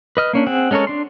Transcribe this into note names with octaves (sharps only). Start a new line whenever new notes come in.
B4 D#5 F6
A#3 C#4 D4
C4 G#4 F#5
G#3 C#4 A4 A#4 C#5
D4 C6